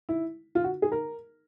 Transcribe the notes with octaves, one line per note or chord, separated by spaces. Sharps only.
E4
F4
F#4
G#4
A#4